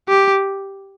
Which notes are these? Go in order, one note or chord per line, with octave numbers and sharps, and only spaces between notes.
G4